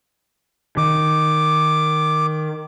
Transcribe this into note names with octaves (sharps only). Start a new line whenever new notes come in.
D#3 D6